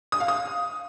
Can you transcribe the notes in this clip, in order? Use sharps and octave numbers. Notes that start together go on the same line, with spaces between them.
D#6
F5
D#6